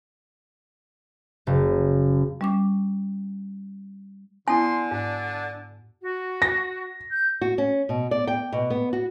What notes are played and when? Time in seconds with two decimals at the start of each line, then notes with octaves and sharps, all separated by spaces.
1.47 F#1
2.41 G3 C#4 D6
4.48 D3 B3 E4 G#5 C6
4.91 G#2 D4
6.01 F#4
6.42 A#6
7.10 G6
7.41 F#4
7.58 C#4
7.89 B2
8.11 D5
8.28 G5
8.52 B2
8.70 B3
8.93 F#4